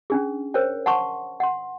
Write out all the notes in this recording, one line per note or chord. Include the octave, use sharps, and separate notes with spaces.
C#4 D4 G#4
A#4 C5 C#5 G5
F#5 A5 C6 C#6
F#5 C6